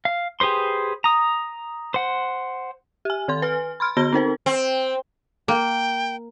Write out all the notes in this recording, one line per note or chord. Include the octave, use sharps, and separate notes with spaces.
F5
G4 G#4 B4 C5 C6
A#5 D#6
C5 F#5
G4 G#5
D#3 A4 C6
B4 G#5 F6
B5 C6 F6
D3 B3 F#4 B5 A#6 G7
C4 D#4 A#4 C5
C4
A#3 G5